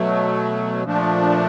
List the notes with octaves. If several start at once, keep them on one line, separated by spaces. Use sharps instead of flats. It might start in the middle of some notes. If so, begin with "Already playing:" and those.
Already playing: B2 F#3 A3
A#2 F3 A3 D4